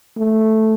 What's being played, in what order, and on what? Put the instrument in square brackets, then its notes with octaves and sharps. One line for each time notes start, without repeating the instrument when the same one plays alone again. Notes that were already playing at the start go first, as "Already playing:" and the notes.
[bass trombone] A3